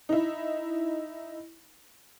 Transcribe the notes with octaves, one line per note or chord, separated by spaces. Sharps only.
D#4 E4